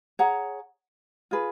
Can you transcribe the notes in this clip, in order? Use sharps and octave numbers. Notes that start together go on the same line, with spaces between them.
G#4 C#5 F#5 A#5
F4 G#4 B4